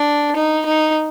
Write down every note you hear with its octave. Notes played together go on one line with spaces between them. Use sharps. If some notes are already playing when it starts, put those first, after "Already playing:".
Already playing: D4
D#4
D#4